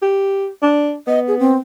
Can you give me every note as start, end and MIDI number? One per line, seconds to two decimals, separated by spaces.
0.02 0.48 67
0.62 0.95 62
1.07 1.59 59
1.07 1.20 75
1.28 1.35 68
1.39 1.55 60